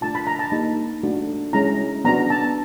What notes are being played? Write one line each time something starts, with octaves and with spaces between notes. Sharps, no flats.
A3 D4 F4 A5
B5
A#5
A5
A#3 D#4 G4
A3 D4 F#4
G#3 C#4 E4 A#5
B3 D4 F#4 A#5
A5